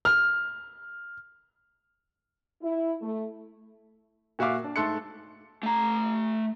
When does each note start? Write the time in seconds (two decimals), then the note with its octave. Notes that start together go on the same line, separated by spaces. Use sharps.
0.05 F6
2.62 E4
3.01 A3
4.39 A#2 F#4 E5 F5 D6
4.64 D4
4.76 G#2 A3 A4 C6 F#6 C#7
5.63 A3 A#5